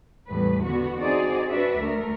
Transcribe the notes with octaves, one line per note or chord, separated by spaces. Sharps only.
E2 A2 G3 B4
D3 B3 F#4
C4 D#4 F#4 G#4 D5
D4 F#4 B4 D5 E5
D2 A3 A#4